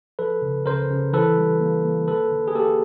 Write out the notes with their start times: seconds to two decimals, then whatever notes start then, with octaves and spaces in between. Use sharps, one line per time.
0.19 F3 A4 B4
0.42 C#3
0.66 C#3 A#4 C5
0.90 C#3
1.13 E3 A4 B4
1.38 G3
1.61 A#3
1.84 A#3
2.08 D3 A4 B4
2.31 D3
2.48 G#4
2.55 A#3 G4 A4